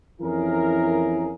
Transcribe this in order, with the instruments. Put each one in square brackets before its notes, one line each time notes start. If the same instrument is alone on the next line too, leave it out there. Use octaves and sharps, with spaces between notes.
[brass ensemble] F2 E3 C#4 E4 G#4 A#4